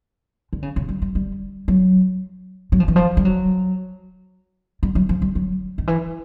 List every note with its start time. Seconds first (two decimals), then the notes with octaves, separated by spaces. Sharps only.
0.53 D3
0.62 C#3
0.76 C#3
0.89 G3
1.02 G3
1.15 G3
1.68 F#3
2.72 F#3
2.80 F3
2.88 E3
2.96 F3
3.17 G3
3.25 F#3
4.83 G3
4.95 F#3
5.09 F3
5.22 G3
5.35 F#3
5.78 D#3
5.87 E3